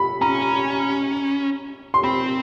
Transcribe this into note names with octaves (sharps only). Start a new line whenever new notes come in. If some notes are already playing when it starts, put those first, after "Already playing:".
Already playing: B5
C#4 A#5
C6
C4 B5